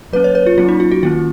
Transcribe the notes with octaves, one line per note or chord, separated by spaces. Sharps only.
F#3 A#3 C#4 B4
C#5
B4
F4
F#3 A#3 C#4 F4
D#4
F4
F#4
D#3 A#3 C#4 F4